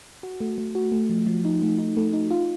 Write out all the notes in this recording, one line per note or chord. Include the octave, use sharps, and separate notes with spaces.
F#4
A3
A3
F#4
A3
F3
F3
D#4
A3
D#4
A3
D#4
F4